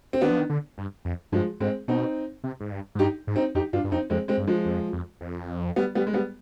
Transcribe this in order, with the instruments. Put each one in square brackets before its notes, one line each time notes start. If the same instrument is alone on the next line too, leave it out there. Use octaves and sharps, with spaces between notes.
[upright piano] C4
[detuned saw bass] D#3 [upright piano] B3 D4
[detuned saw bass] F3
D#3
D3
G2
F2
[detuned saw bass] G2 [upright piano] F3 G#3
[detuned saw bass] G#2 [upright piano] G#3 C4
[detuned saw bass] B2 [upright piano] C4 D#4
[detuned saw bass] C3
G#2
G2
G#2
[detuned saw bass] G2 [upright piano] D#4 G4
[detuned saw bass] G#2
[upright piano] C4 D#4
[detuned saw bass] F2 [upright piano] D#4 G4
[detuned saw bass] G2 [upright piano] D4 F4
[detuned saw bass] G2
[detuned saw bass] F2 [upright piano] C4 D#4
[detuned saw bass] F2 [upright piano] G#3 C4
[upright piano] G#3 C4
[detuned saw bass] G2
[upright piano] F3 G#3
[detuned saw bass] F2
F2
F2
[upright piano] G3 B3
G3 B3
G#3
G3 B3